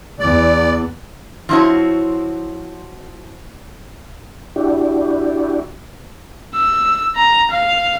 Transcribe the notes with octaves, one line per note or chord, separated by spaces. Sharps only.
E2 D5
F3 C4 E4 F#4 C#5
D4 E4 F#4 G4
E6
A#5
F5